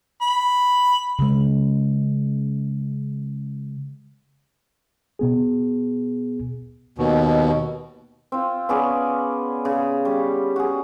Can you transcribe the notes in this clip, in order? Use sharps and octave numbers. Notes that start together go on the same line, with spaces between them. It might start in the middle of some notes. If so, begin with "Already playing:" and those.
B5
C#3 G#3
B2 B3 G#4
D#2 B2
C4 F4
B3 C#4 G#4 D5
C#3
G3 C#4
F#4 G#4